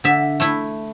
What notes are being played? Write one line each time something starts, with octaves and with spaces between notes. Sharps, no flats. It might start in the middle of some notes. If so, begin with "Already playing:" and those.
D3 E5
A3 E4